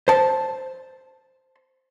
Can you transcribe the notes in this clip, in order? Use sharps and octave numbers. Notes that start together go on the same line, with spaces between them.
C5 A5